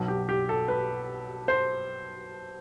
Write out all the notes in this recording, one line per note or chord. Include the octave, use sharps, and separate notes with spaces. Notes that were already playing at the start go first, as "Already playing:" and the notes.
Already playing: B1 B2
G4
G4
A4
B4
C5